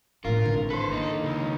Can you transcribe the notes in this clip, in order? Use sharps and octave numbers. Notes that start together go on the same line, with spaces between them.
A2 D4 F4 A#4
G#1 D3 E3 D4
A4 B4 C5
D#3 A#3 D#4
C#2